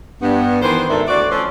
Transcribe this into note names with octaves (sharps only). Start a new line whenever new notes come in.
G2 B3
D#3 E3 B4 C5
D2 G#2 D3 D#3 A4 E5
D2 F#4 C#5 D5
F3 A3 C#4 A4 C5